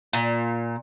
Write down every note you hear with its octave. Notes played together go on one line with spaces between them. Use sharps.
A#2